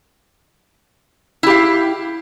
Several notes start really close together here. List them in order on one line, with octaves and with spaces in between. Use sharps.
E4 G4 F5